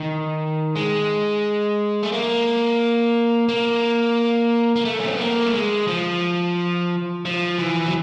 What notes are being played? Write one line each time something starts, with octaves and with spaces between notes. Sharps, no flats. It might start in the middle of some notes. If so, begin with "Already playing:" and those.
Already playing: D#3
G#3
A3
A#3
A#3
A#3
A3
C#4
C4
B3
A#3
A3
G#3
F3
F3
E3
F#3